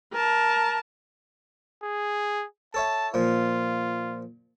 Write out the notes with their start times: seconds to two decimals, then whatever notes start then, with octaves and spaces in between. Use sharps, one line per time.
0.13 A#4 A5
1.83 G#4
2.74 A4 C#5 E5 A5
3.14 A#2 F3 F4